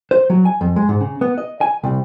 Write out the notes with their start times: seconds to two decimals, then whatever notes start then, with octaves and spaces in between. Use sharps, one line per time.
0.11 C5
0.30 F#3
0.45 G#5
0.61 F2
0.76 G#3
0.89 G#2
1.01 C#3
1.21 B3
1.38 D#5
1.61 G#5
1.84 C2